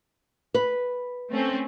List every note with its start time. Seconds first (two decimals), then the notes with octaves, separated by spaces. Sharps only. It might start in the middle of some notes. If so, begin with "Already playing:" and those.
0.54 B4
1.31 A3 C4 C#4